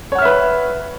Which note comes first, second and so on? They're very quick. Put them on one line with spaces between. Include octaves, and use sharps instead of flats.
C#5 F#5 F6 E5 B4